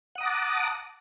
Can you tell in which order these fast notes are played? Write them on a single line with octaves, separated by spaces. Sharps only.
F#5 D#6 A#5 D6 A5